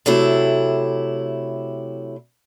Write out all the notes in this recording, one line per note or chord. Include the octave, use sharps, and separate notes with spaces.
C3 F#3 A3 E4